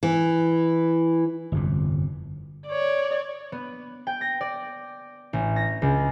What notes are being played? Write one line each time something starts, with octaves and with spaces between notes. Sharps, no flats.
E3
G1 F2 C3
C#5 D5
B3
G5
A#6
D5
A1
A#6
C#2